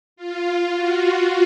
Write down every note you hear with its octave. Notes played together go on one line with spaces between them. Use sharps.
F4
F#4